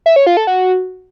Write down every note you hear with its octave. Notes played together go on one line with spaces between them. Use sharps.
E5
C#5
F4
A4
F#4